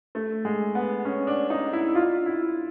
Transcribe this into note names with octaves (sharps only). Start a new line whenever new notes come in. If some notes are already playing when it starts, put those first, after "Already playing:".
A3
G#3
B3
C#4
D4
D#4
E4
F4
E4